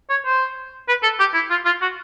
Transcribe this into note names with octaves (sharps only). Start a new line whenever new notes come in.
C#5
C5
B4
A4
G4
E4
F4
F4
F#4